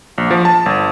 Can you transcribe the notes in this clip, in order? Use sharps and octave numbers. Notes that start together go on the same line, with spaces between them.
A#1
F3
A5
G1